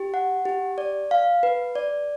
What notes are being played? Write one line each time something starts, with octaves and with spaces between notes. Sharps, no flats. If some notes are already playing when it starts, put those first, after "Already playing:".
Already playing: G4
F#5
G4
D5
F5
B4
D5